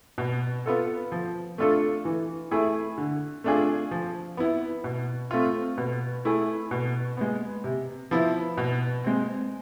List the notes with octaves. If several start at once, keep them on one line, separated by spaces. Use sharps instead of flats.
B2
B3 F4 A4
F3
A3 D4 F4 A4
E3
A3 E4 G#4
D3
A3 D4 F4 G#4
F3
B3 E4
B2
A3 C4 F4
B2
A3 E4 G#4
B2
G#3 B3
C3
F3 B3 E4
B2
G#3 C4